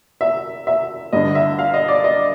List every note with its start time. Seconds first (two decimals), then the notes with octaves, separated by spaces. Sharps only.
0.21 E5
0.67 E5
1.13 G2 D3 D#5
1.35 E5
1.59 F5
1.74 D#5
1.88 D5
2.04 D#5